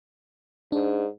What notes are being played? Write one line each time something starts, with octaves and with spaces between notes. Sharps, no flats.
G#2 D4